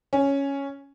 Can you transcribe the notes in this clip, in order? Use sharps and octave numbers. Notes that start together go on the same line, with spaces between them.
C#4